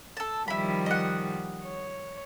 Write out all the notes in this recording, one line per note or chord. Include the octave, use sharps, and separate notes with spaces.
A4 A5
D#3 F3 G3 E4 B5
D#5 F#5
C#5